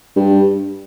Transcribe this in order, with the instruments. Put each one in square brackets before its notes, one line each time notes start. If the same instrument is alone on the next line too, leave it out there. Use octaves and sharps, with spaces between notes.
[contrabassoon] G2